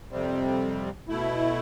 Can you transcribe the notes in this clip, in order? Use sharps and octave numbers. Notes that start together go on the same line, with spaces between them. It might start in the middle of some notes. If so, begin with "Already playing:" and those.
F2 C3 G3 C4
B2 A3 E4